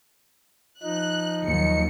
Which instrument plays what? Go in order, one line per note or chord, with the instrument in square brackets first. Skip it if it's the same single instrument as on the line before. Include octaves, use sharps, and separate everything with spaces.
[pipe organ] F3 D#4 [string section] F#6
[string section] D#2 F#3 C#7